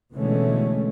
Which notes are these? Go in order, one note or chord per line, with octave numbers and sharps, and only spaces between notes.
B2 D3 E3 G#3 A3 C#4